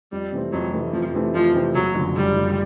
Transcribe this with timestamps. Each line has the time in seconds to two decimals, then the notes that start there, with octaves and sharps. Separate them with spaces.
0.12 F2 G3
0.33 C3 E3 A3 C4
0.52 F2 F#3
0.73 C3 E3 A3 C4
0.93 F2 F3
1.14 C3 E3 A3 C4
1.34 F2 F3
1.54 C3 E3 A3 C4
1.75 F#1 F#3
1.95 F#2 D3 F3
2.16 F#1 G3
2.36 F#2 D3 F3